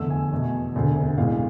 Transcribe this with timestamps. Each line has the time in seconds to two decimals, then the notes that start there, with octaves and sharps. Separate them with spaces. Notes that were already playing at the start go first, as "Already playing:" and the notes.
Already playing: F1 E2 D3 A3 E6
0.10 G#5
0.31 E2 B2 A3
0.75 E1 D2 C3
1.18 B1 A2 G#3 F5